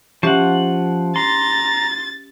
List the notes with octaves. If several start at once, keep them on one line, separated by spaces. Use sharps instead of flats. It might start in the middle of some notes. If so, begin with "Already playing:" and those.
F3 C#4 G4 E5 F#5
A#5 C6 A6